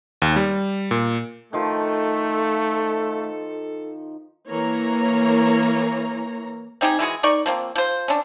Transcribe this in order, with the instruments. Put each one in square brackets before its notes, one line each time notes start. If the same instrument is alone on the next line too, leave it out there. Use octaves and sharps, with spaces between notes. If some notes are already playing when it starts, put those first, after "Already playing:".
[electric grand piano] D#2
G3
A#2
[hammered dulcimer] D#3 F3 [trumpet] A3 [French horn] A4
[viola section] E3 A#3 C#5 A#5
[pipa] C4 D#4 G4 G#4
E3 G#3 F#4 G#4
D#4 A#4 D5 C#6
F3 A#3 C4
F3 C5
C#4 D4